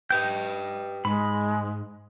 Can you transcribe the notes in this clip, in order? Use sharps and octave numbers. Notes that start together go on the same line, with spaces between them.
G4 B4 D#5 G5 G6
G#2 G#3 B5